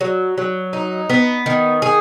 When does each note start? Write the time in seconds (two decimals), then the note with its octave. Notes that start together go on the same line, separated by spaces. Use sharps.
0.01 F#3
0.38 F#3
0.73 D#4
1.10 B3
1.46 D#3
1.82 G#4